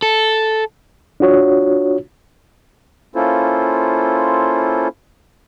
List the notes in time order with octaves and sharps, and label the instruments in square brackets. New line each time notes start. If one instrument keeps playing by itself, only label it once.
[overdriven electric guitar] A4
[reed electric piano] D4 F4 F#4 C#5
[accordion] A#3 C#4 E4 F4 A4 C5